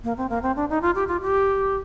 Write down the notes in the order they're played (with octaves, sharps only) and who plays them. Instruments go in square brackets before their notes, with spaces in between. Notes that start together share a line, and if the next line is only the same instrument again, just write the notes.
[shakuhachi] A#3
C4
A#3
C4
D4
D#4
F4
G4
F4
G4